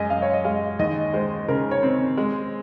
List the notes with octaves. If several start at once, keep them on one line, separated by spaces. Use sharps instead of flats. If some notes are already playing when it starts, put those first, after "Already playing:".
Already playing: F#2 G#3 D#5 G#5
F#2 F5
C#5
D#5
G#3 F5
D#2 D#5
G#3 C5
C#3 A#4
C#5
C4
G#3